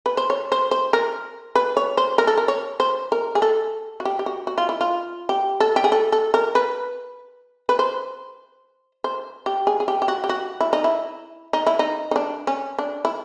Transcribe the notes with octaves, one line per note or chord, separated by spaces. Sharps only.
B4
C5
C#5
C5
C5
A#4
B4
C#5
C5
A#4
A4
A#4
C#5
C5
A#4
G#4
A4
F#4
G4
G4
F#4
F#4
F4
E4
F4
G4
A4
G4
G#4
A4
A4
A#4
B4
B4
C5
C5
G4
G#4
G#4
G4
G4
F#4
G4
F#4
E4
D#4
E4
D#4
E4
D#4
D#4
D4
C#4
D4
E4